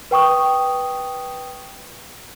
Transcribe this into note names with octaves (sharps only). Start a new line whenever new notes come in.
B4 G5 C#6 D#6